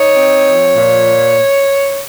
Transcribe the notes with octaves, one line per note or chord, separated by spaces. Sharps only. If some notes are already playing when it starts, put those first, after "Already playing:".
Already playing: D#4 C#5
C4
F3
A#2